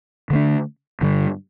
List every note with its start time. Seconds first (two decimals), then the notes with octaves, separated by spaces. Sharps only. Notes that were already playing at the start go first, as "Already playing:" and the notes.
0.30 D3 A3 D4
1.01 G2 D3 G3